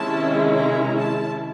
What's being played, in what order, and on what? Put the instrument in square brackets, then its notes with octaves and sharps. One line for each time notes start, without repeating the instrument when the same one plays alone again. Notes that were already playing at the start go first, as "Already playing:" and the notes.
Already playing: [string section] C3 D#3 G#3 C#4 E4 A5
A#5
A5